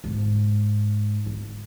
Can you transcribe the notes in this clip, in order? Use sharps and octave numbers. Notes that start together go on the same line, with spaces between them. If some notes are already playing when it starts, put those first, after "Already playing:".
G#2
G#2